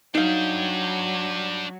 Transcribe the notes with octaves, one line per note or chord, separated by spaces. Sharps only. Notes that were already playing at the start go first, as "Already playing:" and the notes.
F#3 D4 D#4 F5 G5